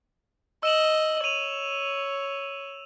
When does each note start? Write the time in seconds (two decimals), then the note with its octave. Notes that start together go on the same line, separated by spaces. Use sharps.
0.63 D#5 E6 E7 F#7
1.24 C#5 D#7 F7